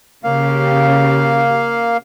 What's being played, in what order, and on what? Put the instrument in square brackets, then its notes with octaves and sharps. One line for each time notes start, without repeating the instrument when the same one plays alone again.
[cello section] C#3 G4 [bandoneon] A#3 F5